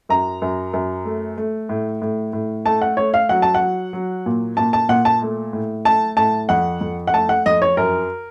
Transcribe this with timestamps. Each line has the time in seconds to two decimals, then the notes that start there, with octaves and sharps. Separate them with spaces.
0.09 F#2 A#5
0.42 F#2
0.73 F#2
1.05 A3
1.37 A3
1.69 A2
2.02 A2
2.33 A2
2.65 A3 A5
2.81 F#5
2.97 A3 C#5
3.14 F5
3.29 F#3 F#5
3.42 A5
3.54 F#5
3.61 F#3
3.93 F#3
4.26 A#2
4.57 A#2 A5
4.73 A5
4.89 A#2 F#5
5.05 A5
5.22 A3
5.53 A2
5.85 A3 A5
6.17 A2 A5
6.49 F2 F#5
6.81 F2
7.07 F#5
7.14 A3 A5
7.29 F#5
7.46 F2 D#5
7.62 C#5
7.77 F#2 A#4